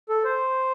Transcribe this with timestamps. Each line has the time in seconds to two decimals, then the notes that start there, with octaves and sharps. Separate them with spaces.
0.09 A4
0.25 C5